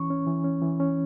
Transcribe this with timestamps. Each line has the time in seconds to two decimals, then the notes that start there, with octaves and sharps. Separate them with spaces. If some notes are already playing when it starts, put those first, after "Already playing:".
Already playing: E3 C#4 C#6
0.10 C#4
0.27 E3
0.44 C#4
0.62 E3
0.80 C#4